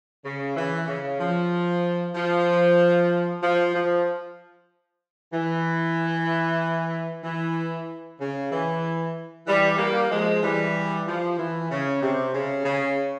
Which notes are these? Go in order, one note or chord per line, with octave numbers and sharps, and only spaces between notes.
C#3
E3
C#3
F3
F3
F3
F3
E3
E3
C#3
E3
E3 G3
G3 A#3
F3 G#3
E3 G3
F3
E3
C#3
C3
C#3
C#3